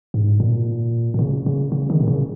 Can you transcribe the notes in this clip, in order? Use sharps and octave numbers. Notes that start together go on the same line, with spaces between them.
G#2
A#2
A#2
C#3
C#3
C#3
D#3
A#2
C#3